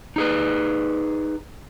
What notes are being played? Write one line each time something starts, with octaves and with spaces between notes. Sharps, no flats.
D#4 G#4 B4